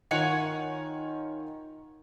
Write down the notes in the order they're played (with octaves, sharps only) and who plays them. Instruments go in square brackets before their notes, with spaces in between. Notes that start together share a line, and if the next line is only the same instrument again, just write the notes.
[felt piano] D#3 F4 [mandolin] C#5 F#5 G#5